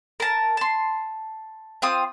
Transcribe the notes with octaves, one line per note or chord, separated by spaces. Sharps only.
A#4 A5
A5 C6
C4 F4 D#6